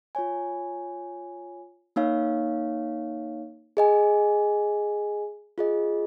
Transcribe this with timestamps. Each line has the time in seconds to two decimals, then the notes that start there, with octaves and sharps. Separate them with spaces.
0.15 F4 C#5 G#5
1.96 A#3 D#4 C#5 F5
3.77 G#4 D#5 G#5
5.58 F4 G#4 D#5